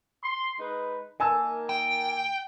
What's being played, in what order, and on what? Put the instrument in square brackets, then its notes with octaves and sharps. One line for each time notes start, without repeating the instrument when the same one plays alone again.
[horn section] C6
G#3 D#4 B4
[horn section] D#3 A#3 [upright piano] G#5 A5 E6
[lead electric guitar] G5